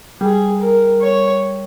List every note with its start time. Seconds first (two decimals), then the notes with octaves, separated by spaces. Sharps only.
0.21 G3 G#4
0.60 A#4
1.01 C#5